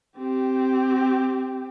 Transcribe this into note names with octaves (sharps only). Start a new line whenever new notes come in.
C4 G4